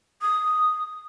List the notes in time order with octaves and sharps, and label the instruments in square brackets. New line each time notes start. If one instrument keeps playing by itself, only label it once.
[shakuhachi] D#6